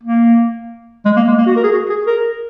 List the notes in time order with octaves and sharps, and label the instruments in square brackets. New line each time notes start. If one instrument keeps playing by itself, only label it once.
[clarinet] A#3
G#3
A#3
G#3
A#3
F#4
A#4
G#4
F#4
G#4
A#4